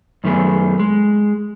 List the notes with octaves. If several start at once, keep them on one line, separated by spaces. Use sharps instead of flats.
F#2 D#3 A3 B3 G#4
G#3